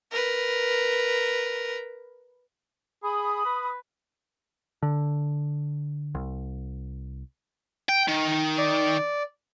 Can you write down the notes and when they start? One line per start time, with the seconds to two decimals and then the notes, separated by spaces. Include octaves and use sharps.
0.12 A#4 B4
3.03 G#4 B5 D#6
3.45 B4
4.82 D3
6.15 C2
7.89 G5
8.08 D#3
8.58 D5